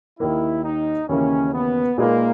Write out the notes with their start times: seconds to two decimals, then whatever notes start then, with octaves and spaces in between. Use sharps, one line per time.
0.20 D#2 D#3 A#3 E4
0.64 D#4
1.09 D#2 C#3 E3 A#3 C#4
1.53 B3
1.98 A#2 G#3 A#3 D#4 G#4 B4